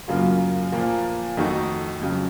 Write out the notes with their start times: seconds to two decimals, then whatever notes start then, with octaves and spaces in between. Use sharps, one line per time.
0.08 F#2 C#3 F#3 A#3 F4
0.72 A#2 F3 A#3 F4
1.37 F2 D#3 A3 D#4 F#4
2.01 F2 C#3 F#3